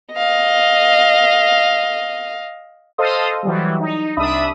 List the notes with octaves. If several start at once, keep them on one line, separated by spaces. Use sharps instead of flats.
D#5 F5
A4 C5 D#5 F5 C6 D#6
E3 F#3 G3
D#4
C2 D4 E5 B5 D#6